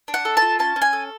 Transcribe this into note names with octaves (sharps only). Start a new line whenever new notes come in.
D4
F#5
A4
F4 A5
C#4 A5
C#4
G#5
A4